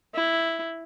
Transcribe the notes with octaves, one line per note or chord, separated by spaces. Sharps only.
E4